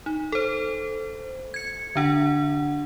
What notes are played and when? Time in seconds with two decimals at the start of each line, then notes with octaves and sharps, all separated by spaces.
0.06 D#4
0.32 A4 C5
1.54 G#6 C#7
1.95 D3 D4 F#5